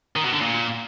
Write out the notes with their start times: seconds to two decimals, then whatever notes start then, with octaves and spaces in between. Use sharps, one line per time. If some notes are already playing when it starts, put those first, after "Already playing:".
0.16 D#3
0.24 B2
0.32 D3
0.41 A#2